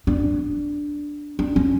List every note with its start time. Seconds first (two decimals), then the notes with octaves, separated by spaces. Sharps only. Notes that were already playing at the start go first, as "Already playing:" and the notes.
0.07 D4
1.39 D4
1.56 C#4